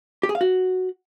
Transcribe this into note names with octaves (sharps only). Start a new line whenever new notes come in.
G4
G#4
F5
F#4